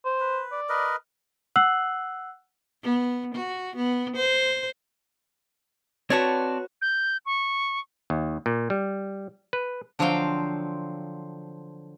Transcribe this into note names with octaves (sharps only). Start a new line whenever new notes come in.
C5
B4
D5
A#4 B4 D#5
F#5 E6 F#6 C7 F#7
B3
F#4
B3
C5
C4 F#4 B4 C#5 D5 A5
G6
C#6
D#2
A#2
G3
B4
D3 F3 F#3 C4 F5 G5